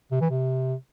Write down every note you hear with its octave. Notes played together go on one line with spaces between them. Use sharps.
C3
E3
C3